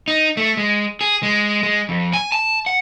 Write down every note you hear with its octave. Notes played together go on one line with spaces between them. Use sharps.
D#4
A3
G#3
G#4
G#3
G#3
F2
G#5
A5
F#5